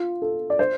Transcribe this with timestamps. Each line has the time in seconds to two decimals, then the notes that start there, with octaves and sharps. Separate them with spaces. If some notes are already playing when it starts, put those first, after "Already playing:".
Already playing: F4
0.22 A4
0.50 D5
0.59 C5